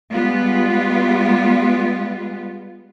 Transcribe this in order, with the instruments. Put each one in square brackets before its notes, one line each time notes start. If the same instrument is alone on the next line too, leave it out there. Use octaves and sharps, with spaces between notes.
[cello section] G3 G#3 B3 F4